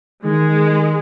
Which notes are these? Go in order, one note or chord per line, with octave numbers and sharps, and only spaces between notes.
D#3 G#3